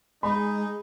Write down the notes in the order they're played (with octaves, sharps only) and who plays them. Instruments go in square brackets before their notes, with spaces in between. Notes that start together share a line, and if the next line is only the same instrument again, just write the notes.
[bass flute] G#3 [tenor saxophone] D#4 [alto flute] G#4 [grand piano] B5